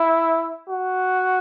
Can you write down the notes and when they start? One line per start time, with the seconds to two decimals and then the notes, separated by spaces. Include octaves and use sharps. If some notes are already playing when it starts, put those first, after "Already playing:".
Already playing: E4
0.70 F#4